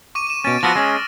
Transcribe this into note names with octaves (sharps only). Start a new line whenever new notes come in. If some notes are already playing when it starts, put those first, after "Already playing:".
C#6 D6 D#7
D#7 E7
B2 C#4 A6 D7
F3 B3 F#4 E6 F6 A#6
G#3 C#4